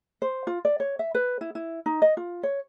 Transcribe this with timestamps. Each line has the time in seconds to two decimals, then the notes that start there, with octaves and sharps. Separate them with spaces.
0.22 C5
0.47 F4
0.65 D5
0.80 C#5
0.99 E5
1.15 B4
1.41 E4
1.55 E4
1.86 D#4
2.02 D#5
2.17 F4
2.43 C#5